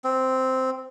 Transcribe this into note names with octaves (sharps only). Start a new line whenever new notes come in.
C4